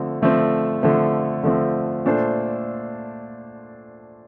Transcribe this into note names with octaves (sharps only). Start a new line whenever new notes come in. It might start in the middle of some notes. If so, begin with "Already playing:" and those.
Already playing: D3 F3 A3 C4
D3 F3 A3 C4
D3 F3 A3 C4
D3 F3 A3 C4
A#2 A3 D4 A4 C5